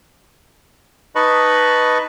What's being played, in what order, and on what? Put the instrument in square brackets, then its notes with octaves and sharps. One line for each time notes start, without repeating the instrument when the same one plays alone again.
[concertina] D#4 B4 D#5 A5 B5 C#6